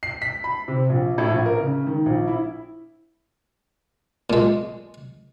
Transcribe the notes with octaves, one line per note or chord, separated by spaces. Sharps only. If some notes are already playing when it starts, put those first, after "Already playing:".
C7
B6
B5
C3
A#1
A2
A#1
A#4
C#3
D#3
A#1
E4
A#2 G#3